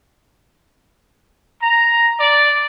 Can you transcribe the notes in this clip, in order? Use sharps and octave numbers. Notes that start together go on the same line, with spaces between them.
A#5
D5